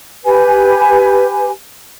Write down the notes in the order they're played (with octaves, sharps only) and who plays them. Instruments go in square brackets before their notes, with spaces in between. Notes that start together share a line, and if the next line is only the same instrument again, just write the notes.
[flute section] G4 B4 G#5